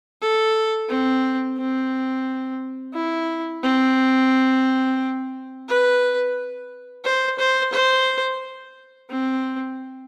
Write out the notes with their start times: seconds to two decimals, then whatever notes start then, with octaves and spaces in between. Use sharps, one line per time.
0.22 A4
0.89 C4
1.58 C4
2.94 E4
3.63 C4
5.69 B4
7.05 C5
7.39 C5
7.73 C5
9.10 C4